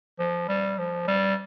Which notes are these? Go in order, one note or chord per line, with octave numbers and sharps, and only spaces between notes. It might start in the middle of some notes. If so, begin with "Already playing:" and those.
F3
G3
F3
G3